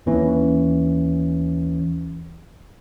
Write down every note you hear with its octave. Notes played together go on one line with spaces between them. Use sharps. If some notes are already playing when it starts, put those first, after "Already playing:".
D#2 E3 C#4